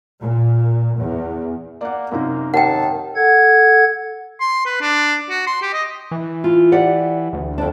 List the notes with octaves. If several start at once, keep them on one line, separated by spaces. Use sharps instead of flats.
A#2
E2
A#3 D5 F#5
F#2 C3 A#3 D#4
D#2 F#5 G5 A5
A4 F#5 G#6
C6
B4
D4
F#4
C6
G4
D#5
E3
F4
G4 D5 F#5
D2
F2 D4